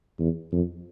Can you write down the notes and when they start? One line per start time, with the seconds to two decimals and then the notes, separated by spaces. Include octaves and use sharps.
0.19 E2
0.52 F2